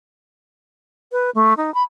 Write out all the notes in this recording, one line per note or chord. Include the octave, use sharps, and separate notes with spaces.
B4
A3
D#4
B5